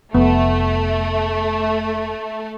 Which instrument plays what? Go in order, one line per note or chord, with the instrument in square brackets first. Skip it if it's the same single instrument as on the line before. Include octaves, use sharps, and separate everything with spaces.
[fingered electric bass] F1 [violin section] A3 [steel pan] B3